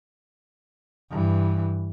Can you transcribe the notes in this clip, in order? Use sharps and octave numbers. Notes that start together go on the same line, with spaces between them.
G2 E3